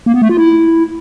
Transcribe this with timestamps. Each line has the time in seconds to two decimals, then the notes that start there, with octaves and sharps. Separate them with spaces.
0.06 A#3
0.14 B3
0.22 A3
0.29 F4
0.37 E4